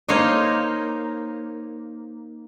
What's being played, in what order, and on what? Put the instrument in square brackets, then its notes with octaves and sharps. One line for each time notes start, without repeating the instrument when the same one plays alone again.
[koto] A#3 D#4 C5 C#5 D#5